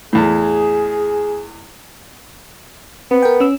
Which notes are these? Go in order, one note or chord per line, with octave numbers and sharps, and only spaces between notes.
E2 A2 G#4
B3 C4
A#4 G5
C#4 E6